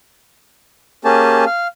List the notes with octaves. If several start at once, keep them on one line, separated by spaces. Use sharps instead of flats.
A#3 C#4 G4 G#4 A5
F5